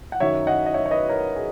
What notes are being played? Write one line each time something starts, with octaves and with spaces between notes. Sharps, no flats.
F#5
F#2 D#3 F#3 C#5 E5
D#5 F#5
D#5
C#5 E5
C#5
B4 D#5
A#4 C#5
G#4